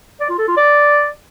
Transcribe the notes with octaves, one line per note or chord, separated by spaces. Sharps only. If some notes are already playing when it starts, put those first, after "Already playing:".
D5
F4
A4
F4
D5